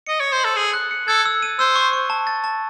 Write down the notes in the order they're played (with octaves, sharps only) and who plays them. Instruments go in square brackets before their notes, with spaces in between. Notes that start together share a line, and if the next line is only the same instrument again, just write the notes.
[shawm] D#5 [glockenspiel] C#7
[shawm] C#5 [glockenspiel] C#7
[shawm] C5
[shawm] A4 [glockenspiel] F#7
[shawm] G#4 [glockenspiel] F#7
[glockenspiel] F#6
C#7
[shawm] A4 [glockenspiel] G#6
[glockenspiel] E6
D#7
[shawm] C5 [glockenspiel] E6
[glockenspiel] C#6
C#6
A5
A6
A5